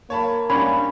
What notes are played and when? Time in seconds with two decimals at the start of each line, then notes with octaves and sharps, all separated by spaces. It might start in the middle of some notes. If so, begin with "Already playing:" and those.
0.10 A#3 C#5 A5 B5
0.50 G#2 G3 C#4 D4 C#5 B5